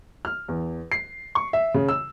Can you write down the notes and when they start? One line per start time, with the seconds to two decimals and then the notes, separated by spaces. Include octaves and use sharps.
0.25 F6
0.48 E2
0.92 C7
1.35 C#6
1.53 E5
1.74 C#3
1.89 E6